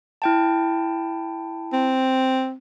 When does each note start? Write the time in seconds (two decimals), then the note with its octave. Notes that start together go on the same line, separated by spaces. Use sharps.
0.22 E4 G5 A5
1.73 C4